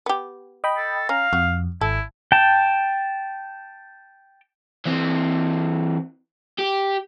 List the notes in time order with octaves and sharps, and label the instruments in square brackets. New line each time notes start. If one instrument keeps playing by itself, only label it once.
[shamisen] B3 G4
[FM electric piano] D#5 G5 B5
[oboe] A4
[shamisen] C#4 [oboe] F5 [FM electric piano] A#5
[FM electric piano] F2 [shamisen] F#4
[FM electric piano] G#1 [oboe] E4 [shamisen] A4
[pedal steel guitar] G5 A5
[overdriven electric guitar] E3 C4
G4